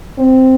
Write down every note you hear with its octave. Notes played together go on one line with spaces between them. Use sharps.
C4